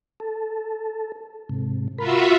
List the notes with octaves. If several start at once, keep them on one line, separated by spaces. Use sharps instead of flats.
A4
G#2 C3
F4 F#4 A#4 E5 B5